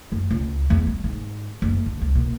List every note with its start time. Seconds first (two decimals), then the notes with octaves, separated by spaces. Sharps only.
0.12 F#2
0.31 C#2
0.70 E2
0.87 G3
1.04 G#2
1.62 F#1
1.86 D3
2.01 C2
2.15 A#2